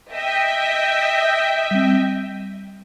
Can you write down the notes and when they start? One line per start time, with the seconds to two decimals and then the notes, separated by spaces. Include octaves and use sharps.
0.13 D#5 E5 G5
1.71 G3 C4